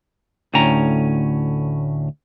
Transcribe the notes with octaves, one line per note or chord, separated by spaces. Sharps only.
D2 A2 C#4 G5 A#5